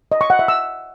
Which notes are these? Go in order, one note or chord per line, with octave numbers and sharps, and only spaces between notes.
D#5
C#6
F#5
E5
E6